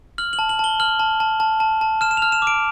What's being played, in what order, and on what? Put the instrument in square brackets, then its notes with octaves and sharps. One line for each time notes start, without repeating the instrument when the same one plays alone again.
[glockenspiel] F6 F#7
F#7
A5
F#7
A5 G7
F6 F#7
A5
A5
A5
A5
A5
F6 E7
E7
F7
F6
E7
D6
D7